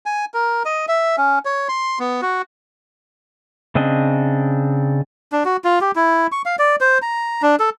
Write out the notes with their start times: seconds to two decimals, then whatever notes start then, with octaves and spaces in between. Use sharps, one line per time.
0.06 G#5
0.34 A#4
0.65 D#5
0.88 E5
1.18 C#4
1.45 C#5
1.69 C6
1.99 B3
2.22 F#4
3.75 C#3 C4 D4 D#5
5.32 D4
5.45 F#4
5.64 F4
5.81 G4
5.96 E4
6.32 C#6
6.46 F5
6.59 D5
6.81 C5
7.02 A#5
7.42 D4
7.60 A4